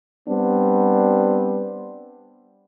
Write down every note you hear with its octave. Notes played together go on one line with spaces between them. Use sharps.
G3 B3 C4 D4